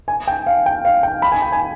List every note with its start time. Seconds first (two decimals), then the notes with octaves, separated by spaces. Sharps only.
0.08 G#5
0.27 G5
0.47 F5
0.66 G5
0.85 F5
1.03 G5
1.22 B5
1.32 G#5
1.42 G5
1.52 G#5